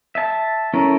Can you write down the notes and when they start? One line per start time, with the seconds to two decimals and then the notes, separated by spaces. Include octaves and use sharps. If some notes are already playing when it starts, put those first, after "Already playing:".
0.15 E5 A5
0.74 A3 C#4 E4 A4 A#4